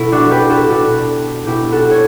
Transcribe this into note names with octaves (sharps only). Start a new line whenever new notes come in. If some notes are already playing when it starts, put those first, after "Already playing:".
Already playing: B2 E4 A4
D4 F#4
G4 B4
F#4 A4
B2 D4 F#4
B2 E4 G4
F#4 A4
C#5